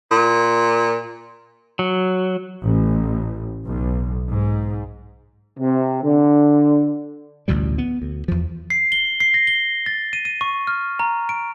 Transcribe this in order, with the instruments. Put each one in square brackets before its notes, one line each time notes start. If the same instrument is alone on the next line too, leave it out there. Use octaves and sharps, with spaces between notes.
[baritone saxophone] A#2
[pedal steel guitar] F#3
[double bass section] A1
B1
G#2
[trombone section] C3
D3
[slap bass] A1 D2 B2 G3
B3
D2
E2 F3
[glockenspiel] C7
G7
C7
A#6
G7
A6
D#7
D#7
C#6
F6
A#5
D7